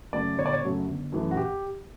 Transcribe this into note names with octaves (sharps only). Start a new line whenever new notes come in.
F#2 C#3 F#3 A3 D5
G1 C#5
D5
C#5
F#2 C#3 F#3 A3
G1
F#2 E3 A3
F#4
G4